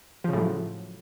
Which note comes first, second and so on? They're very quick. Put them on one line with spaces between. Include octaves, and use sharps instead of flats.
F3 C#3 A2 F#3